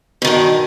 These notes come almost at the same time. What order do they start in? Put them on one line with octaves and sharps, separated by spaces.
B2 D#3 G2